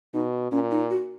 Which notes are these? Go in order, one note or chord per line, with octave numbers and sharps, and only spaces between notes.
B2 D#4
A#2 C#4
D#4
F#4